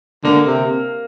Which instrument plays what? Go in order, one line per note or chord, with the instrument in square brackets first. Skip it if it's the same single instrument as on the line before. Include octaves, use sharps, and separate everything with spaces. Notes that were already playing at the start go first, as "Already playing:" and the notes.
[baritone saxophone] D3 [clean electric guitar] A#3
[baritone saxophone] C3